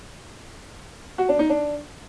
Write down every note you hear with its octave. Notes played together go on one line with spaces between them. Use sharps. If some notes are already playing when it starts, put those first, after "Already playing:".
F#4
D4
D#4
D4